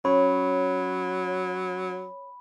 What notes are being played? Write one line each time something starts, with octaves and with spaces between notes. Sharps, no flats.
F#3 C#4 C#5 B5